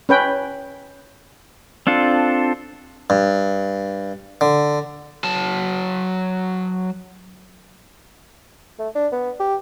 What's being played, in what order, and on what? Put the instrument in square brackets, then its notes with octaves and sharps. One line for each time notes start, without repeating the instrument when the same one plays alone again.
[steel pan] C#4 B4 G5
[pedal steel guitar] C4 D4 F4 A4
[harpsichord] G2
D3
[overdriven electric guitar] F#3 A5
[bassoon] A3
D4
B3
G4